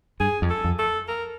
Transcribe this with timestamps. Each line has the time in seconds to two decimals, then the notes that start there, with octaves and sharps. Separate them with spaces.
0.20 G2 G#4
0.42 F2
0.50 A4
0.64 F2
0.79 A4
1.08 A#4